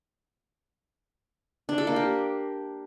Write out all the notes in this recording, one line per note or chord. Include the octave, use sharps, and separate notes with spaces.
D4
A4
A#3
G4